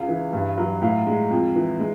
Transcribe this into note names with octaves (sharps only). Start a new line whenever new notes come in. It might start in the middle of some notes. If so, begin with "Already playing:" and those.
Already playing: C#2 F5
E3
G2
F#3
A2 F5
G#3
F2
E3
G#3